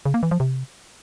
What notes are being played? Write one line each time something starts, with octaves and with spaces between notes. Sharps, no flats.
C#3
A#3
E3
F3
C3